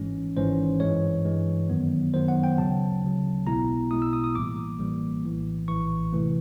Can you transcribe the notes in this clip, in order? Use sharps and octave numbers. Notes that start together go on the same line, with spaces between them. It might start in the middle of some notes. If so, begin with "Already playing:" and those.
Already playing: G#1 G#2 E3 G#3 C#4
G#1 G#2 E3 G#3 C#4 C5
G2 E3 G#3 C#5
G2 E3 G#3
F#2 D#3 F#3 B3
F#2 D#3 F#3 B3 C5
F#5
G5
D2 C#3 F#3 A5
D2 C#3 F#3
B1 B2 G#3 B3 E4 A#5
B1 B2 G#3 B3 E4 D#6
E6
D#6
D#6
A1 A2 E3 G3 A#3 D6
A1 A2 E3 G3 A#3
A#1 A2 E3
A#1 A2 E3 C#6
C3 E3 A3